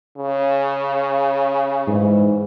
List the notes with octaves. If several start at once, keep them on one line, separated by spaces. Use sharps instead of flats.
C#3
G#2 E3